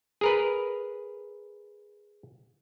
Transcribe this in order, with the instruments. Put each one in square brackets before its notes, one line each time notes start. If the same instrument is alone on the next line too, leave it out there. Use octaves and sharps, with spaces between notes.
[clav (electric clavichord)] G#4 A#4 B4